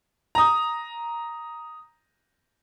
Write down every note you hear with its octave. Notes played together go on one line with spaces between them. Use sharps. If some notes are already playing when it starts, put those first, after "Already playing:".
A#5 D#6